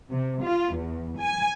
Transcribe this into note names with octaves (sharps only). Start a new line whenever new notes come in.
C3
F4
E2
G#5